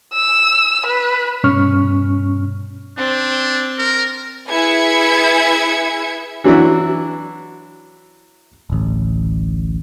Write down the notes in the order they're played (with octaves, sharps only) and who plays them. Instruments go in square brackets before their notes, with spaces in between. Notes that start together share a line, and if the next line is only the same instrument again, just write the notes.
[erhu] E6
B4
[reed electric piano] G2 B2 C#4 C#6 F6
[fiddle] C4 [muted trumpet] D4
[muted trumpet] A#4
[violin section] E4 G#4 B4 E5 G#6 C#7
[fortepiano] E3 F#3 D4 E4 F#4
[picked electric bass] D1 A1